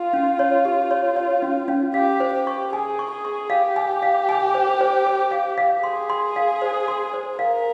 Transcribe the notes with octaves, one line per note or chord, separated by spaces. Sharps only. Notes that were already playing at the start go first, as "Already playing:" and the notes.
Already playing: F4
C#4
C#5
G4
C#5
C#5
C#4
C#4
G4 F5
C5
G4
C#6
G#4 G#5
C#6
G#4
C#6
G4 F5
G#5
F5
G#5
C5
C5
C5
F5
F5
G#4 C6
C6
F5
C5
C6
C5
A#4 F5